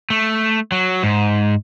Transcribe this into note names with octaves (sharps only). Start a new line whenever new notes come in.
A3
F#3
G#2